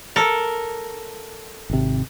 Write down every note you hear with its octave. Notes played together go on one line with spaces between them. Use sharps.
A4 A#4
G#1 C3